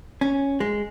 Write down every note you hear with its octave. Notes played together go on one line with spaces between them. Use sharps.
C#4
G#3